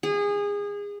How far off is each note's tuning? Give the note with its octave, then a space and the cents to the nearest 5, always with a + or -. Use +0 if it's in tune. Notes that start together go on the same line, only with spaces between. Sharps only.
G#4 -25